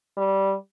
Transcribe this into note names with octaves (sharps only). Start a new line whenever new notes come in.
G3